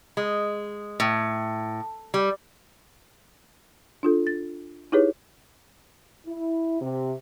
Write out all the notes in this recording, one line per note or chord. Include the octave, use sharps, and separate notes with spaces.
G#3
A2
G3
D4 F4 A4
A6
D#4 E4 G4 G#4 B4 C#5
E4
C3